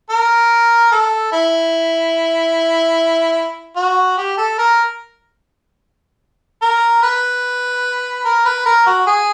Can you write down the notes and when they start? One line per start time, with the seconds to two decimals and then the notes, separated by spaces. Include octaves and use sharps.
0.10 A#4
0.92 A4
1.32 E4
3.76 F#4
4.18 G4
4.38 A4
4.58 A#4
6.62 A#4
7.03 B4
8.25 A#4
8.45 B4
8.66 A#4
8.86 F#4
9.06 G#4